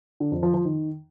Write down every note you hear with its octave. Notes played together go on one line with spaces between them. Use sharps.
D3
F2
F3
F3
D#3